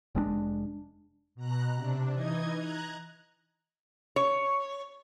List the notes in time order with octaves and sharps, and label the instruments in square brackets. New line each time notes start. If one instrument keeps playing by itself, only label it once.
[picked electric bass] F1 G#3 C4 D4
[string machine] B2 A#5 F#6
C3 D4
E3 D#4 D#5 G#6
A#5 F#6 G#6
[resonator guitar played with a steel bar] C#5